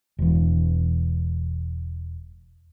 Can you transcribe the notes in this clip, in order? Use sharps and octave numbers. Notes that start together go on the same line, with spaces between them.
E1 E3